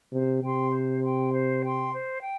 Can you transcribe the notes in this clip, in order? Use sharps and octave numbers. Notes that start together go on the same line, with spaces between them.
C3 C5
C3 G5 C6
C5
G5 C6
C5
G5 C6
C5
G5